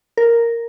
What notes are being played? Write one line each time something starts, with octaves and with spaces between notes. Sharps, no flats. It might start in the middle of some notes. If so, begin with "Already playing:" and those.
A#4